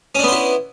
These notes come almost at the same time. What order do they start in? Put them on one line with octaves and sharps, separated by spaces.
C#4 D4 B3 C5 E4